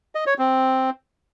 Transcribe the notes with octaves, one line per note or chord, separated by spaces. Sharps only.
D#5
C#5
C4